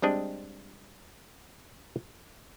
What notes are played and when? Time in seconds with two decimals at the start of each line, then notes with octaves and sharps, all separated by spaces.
0.02 G3 G#3 C4 D4 D#5